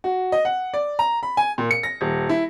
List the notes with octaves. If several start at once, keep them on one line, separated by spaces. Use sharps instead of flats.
F#4
D#5
F#5
D5
A#5
B5
G#5
A#2
C#7
A#6
D#1
E4